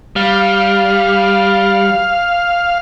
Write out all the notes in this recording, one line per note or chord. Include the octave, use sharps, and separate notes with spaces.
G3 F5